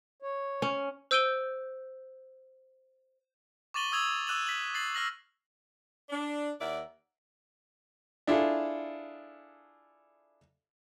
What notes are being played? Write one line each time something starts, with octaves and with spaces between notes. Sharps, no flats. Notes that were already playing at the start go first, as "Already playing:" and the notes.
C#5
C#4
C5 E6 G6 D7 D#7 G7
C#6 D6 A6 D#7 F#7 G7
D#6 E6 G#6 F7 F#7
D6 E6 F#6 D#7 E7 F#7
B6 F#7
A6 C7 F#7
E6 F6 A#6 F#7
D4
D#2 A#4 D5 E5 F#5
D4 E4 F4 G#4 A4